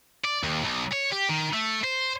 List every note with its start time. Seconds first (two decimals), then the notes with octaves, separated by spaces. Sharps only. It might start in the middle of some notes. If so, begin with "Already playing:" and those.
0.24 D5
0.43 D#2
0.64 B1
0.93 C#5
1.12 G4
1.29 D#3
1.53 A3
1.84 C5